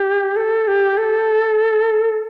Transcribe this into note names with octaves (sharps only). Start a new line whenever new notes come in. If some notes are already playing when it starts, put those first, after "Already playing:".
Already playing: G4
A4
G4
A4